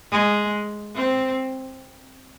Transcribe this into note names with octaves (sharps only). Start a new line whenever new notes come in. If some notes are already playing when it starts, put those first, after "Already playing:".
G#3
C4